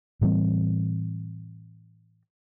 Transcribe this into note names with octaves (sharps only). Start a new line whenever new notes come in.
A2 E3 G3 C4